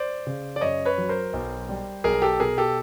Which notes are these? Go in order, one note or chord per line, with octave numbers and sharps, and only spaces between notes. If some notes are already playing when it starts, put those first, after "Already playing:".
Already playing: C5 D5
C#3
D5
F#2 C#5 D#5
B4 C#5
F#3
A#4 C5
B1
G3
B1 G#4 A#4
G4 A4
B2 G#4 A#4
G4 A4